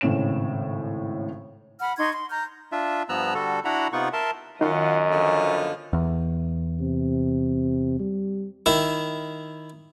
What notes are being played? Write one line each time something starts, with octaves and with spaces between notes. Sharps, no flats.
G#1 A2 C#3 C#4 E7
F#5 B5 F6
D#4 C6 C#6 G#6
C6
A#5 F6 G6
D4 F4 E5
G2 F3 B3 A#5 E6 F#6
D3 G3 F#4 A4
D4 E4 F#4 F#5 A#5 B5
C3 B3 D#4 F4 F#5 C#6
A#4 E5 A5 C6
F#2 D#3 F4 D#5 F#5
D3 F3 B3
E2
C3
G3
D#3 E4